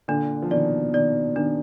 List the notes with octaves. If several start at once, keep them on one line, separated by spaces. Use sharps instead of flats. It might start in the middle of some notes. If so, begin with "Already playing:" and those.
A#2 D3 D4
F3
B2 D#3 D5
B2 D#3 D5
B2 D#3 D4